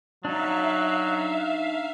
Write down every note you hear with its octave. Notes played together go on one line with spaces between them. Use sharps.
F#3 D4 D#4 E5 F5